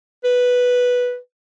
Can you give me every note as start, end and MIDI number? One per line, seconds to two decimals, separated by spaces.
0.24 1.17 71